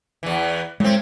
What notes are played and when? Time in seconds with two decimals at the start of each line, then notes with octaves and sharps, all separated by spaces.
0.23 E2 E3
0.80 A2 G#3 C4